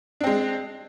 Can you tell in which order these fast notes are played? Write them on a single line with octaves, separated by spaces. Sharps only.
D4 C4 G#3